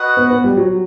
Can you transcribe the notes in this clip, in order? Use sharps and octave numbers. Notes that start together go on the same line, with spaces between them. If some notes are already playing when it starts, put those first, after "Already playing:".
Already playing: F#4 B4 D#5 F#5
B3
B3
G3
F#3